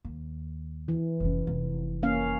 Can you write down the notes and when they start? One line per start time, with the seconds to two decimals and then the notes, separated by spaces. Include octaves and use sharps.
0.05 D#2
0.88 E3
1.20 F1 C#4
1.47 F1
2.03 A#3 C#4 F5